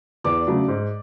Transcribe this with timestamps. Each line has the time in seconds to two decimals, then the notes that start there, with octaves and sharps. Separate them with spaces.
0.24 E2 D5 D6
0.47 C#3 F#3 A3 D4
0.68 G#2